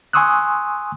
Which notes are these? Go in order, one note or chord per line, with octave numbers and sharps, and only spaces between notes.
G#5 C6 C#6 D#6 E6 F#6